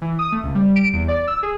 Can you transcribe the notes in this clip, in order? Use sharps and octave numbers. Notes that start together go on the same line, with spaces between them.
E3
D#6
A3
C#2
G3
D7
E2
D5
E6
G#4